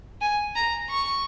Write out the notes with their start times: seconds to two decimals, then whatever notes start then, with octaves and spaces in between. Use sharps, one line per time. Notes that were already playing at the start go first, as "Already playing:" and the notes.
0.21 G#5
0.56 A#5
0.89 C#6